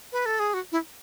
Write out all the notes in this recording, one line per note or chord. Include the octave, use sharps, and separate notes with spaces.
B4
A4
G#4
F#4
E4